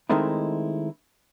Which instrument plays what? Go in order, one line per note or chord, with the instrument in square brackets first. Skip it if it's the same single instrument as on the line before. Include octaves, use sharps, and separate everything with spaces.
[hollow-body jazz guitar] D#3 G#3 A3 C4 D#4 E4